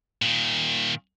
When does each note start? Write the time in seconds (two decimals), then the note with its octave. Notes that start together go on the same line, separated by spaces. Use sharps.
0.22 A#2 D#3